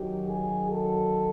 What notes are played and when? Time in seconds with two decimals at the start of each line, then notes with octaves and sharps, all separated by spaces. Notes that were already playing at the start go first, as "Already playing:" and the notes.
Already playing: F#2 D#3 F#3 G4
0.29 G#4
0.72 A4